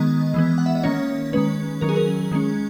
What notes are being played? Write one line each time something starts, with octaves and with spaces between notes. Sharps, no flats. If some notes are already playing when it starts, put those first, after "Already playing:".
Already playing: D#3 G#3 B3 D#5
E3 G#3 B3
F#5
E5
D#5
D#3 A#3 C#4 C#5
D#3 G#3 C#4 B4
D#3 F#3 C#4 A#4
G#4
A#4
D#3 G#3 C#4